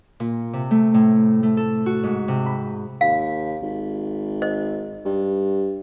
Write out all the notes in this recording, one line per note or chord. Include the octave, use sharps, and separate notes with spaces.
A#2
C3
A3
A2
A3
A4
F#4
G#2
C3
B5
D#2 F5
G#1
C5 D#5
G2